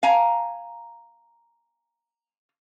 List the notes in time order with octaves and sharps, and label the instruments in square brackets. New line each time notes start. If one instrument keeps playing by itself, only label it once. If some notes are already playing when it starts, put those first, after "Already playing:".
[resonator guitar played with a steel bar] F5 G#5 A#5